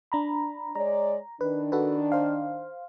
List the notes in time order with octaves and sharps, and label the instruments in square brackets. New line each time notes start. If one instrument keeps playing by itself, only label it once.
[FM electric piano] D4 A#5 B5
[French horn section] G#3 C#5 D5 [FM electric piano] A#5
[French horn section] D#3 D4 [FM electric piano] B4
[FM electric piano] F#4 A4 B4
C5 F5